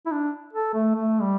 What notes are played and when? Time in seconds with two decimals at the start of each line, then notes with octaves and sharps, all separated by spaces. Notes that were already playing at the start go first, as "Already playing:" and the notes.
0.06 E4
0.12 D4
0.53 A4
0.74 A3
0.95 A3
1.21 G3